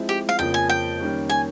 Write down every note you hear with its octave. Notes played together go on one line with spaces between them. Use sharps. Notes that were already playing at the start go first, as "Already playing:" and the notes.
Already playing: F3 G#3 C4 E4
G4
F5
F2 C#3 F3 A#3 G5
G#5
G5
D#3 G3 A#3 C#4
G#5